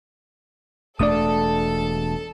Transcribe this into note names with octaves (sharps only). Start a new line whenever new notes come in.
E1 A3 D4 A4 D5 A5 D#6